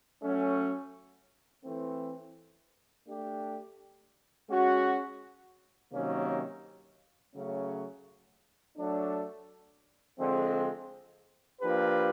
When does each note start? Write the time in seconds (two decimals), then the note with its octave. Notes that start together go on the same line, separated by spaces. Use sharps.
0.23 F#3 A3 C#4
1.65 E3 A3 C4
3.07 A3 D4 G4
4.50 G#3 C#4 F#4
5.92 C3 D#3 F#3 A#3 C#4
7.35 C#3 F#3 A3 C#4
8.77 F#3 A3 D4
10.19 D3 F3 G#3 C4
11.61 F3 A#3 D4 G4 B4